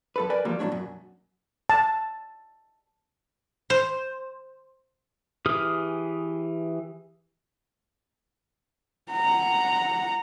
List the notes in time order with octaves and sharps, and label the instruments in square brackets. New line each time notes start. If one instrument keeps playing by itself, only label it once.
[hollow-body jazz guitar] F#2 A4 B4
A#4 B4 D5 G#5
E2 F3 G3 A#3
A2 F#3 G#3 A3 D4 C#5
F#2 B2
[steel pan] A5
[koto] C5
[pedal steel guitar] E3 G4 G#4 D#6 F6
[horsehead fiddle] F#5 A#5